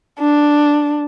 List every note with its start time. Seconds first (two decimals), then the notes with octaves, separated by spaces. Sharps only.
0.20 D4